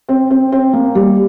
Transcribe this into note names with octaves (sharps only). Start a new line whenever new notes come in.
C4
C4
C4
A#3
G3